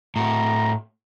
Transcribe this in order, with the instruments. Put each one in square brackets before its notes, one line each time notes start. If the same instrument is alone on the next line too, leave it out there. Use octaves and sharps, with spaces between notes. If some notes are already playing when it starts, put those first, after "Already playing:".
[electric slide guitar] A2 F#4 [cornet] A#5